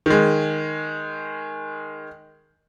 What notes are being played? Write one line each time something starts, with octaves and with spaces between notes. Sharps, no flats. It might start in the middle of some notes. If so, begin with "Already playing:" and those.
D#3 G#3